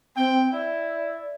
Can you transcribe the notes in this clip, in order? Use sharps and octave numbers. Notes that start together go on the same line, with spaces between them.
C4 G5
E4 D5